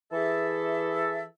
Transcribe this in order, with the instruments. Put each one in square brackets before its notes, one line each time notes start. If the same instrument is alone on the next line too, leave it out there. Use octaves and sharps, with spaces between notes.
[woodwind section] E3 G#4 A4 E5